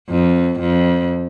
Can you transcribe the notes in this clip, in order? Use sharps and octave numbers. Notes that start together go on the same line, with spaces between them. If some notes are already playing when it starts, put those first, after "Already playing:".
F2
F2